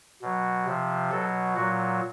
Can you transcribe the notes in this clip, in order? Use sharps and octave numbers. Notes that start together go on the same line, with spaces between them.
B2 F#3
C3 F3
B2 F#3 A4
A#2 F#3 F#4